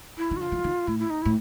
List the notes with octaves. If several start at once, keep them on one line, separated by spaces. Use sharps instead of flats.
E4
D#3
F#4
D3 F4
E3
D#3
A2 E4
E4
D#4
E4
A2